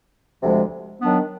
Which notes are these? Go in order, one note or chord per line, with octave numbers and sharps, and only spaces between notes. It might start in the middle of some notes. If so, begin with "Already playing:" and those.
D2 C3 F3 G#3
D#3 F#3 B3 D4